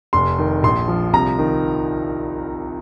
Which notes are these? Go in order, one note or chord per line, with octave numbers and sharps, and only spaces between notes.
F1 C6
D#3
A#1 C6
F3
C2 A#5
D#3